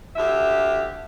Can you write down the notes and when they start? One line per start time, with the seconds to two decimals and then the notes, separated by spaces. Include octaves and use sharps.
0.16 D2 G4 E5